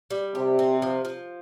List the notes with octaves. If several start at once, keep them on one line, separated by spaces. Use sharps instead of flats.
G3
C3 G4
C4
F3
F3